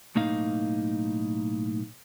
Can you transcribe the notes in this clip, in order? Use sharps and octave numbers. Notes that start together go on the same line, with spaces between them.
B1 A2 A#3 D#4 F5